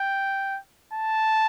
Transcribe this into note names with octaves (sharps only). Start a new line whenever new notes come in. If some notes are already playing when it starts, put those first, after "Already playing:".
Already playing: G5
A5